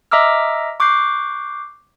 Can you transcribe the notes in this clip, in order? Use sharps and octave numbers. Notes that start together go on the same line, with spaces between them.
D#5 E5 A#5 D6 E6 F6
C#6 D6 F#6 G6 C7